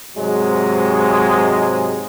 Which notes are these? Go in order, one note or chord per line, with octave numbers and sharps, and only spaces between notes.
G#2 C3 F#3 G#3